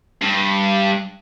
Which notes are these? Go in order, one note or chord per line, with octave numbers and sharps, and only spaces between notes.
G2